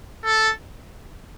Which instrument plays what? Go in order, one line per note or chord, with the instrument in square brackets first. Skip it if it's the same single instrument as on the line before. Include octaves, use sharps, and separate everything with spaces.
[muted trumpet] A4